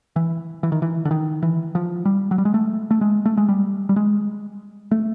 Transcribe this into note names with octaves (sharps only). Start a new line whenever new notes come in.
E3
E3
D#3
E3
D3
D#3
E3
F3
G3
F#3
G3
G#3
A3
A3
G#3
A3
G#3
G3
G3
G#3
A3